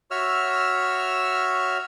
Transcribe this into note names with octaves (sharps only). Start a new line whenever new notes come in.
F#4 C#5 E5 E6 F6